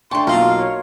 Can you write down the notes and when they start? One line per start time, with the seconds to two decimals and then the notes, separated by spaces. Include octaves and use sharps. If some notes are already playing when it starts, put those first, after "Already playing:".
0.11 A3 D4 G5 A5 C6 C#6
0.27 B1 A#3 F4 D#5 F5
0.58 C#5